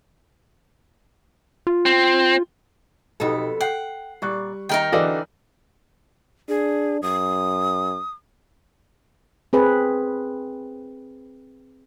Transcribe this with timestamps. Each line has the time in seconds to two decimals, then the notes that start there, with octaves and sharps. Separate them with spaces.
1.67 F4
1.86 C4
3.20 B1 F2 B3 D#4 G4 A4
3.61 F#5 G5 C7
4.22 A#2 G3 D5 C#6 F#6
4.69 D#3 D#4 A#4 G5
4.92 D3 E3 F#4 A4 D5 D#5
6.49 D4 G#4
7.02 F#2 D#6
9.53 C4 G#4 B4